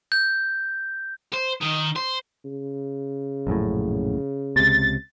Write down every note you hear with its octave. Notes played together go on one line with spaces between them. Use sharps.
G6
C5
D#3
C5
C#3
A#1 F#2 A2
C#2 C3 A6